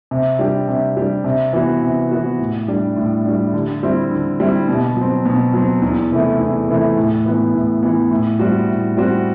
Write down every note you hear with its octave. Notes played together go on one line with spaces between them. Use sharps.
C3
G3 D4 G4
C3
G3 D4 G4
C3
E3 B3 F#4
C3
E3 B3 F#4
A2
G3 D4
A2
G3 D4
D3
G3 C4 E4
D3
G3 C4 E4
B2
F#3
C4
B2
F#3 C4
E2
C3 E3 A3
E2
C3 E3 A3
A2
E3 B3
A2
E3 B3
A2
G3 C4 F#4
A2
G3 C4 F#4